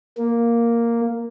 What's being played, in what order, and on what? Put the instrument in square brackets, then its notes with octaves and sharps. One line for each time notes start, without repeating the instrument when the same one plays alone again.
[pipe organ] A#3